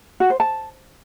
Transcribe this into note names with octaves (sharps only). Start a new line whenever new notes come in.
F#4
C5
A5